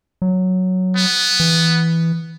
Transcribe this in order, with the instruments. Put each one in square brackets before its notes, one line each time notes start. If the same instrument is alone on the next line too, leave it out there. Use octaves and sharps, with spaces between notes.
[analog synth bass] F#3
[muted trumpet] B3
[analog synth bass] E3